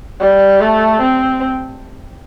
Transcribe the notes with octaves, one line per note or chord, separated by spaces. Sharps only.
G3
A3
C4